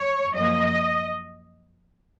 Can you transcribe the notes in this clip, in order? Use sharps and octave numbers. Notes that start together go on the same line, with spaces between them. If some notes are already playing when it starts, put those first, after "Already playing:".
Already playing: C#5
F#2 F3 A#3 D#5